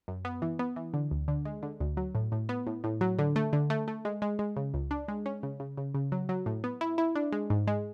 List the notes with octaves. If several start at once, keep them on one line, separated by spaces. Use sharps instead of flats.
F#2
B3
E3
B3
E3
D3
D2
D3
G#3
D3
D2
F#3
A2
A2
B3
A2
A2
F#3
D3
A3
D3
A3
A3
G#3
G#3
G#3
C#3
C#2
D4
G#3
C#4
C#3
C#3
C#3
C#3
F#3
F#3
A2
B3
E4
E4
D4
G#3
G#2
G#3